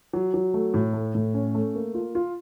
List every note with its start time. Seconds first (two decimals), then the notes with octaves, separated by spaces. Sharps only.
0.13 F#3
0.34 F#3
0.54 A3
0.74 A2
0.93 A3
1.15 A2
1.34 C#4
1.55 A3
1.75 A#3
1.94 F4
2.15 F4